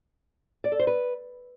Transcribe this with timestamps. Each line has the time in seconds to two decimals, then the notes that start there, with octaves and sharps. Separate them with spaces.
0.64 D5
0.72 A4
0.79 C5
0.87 B4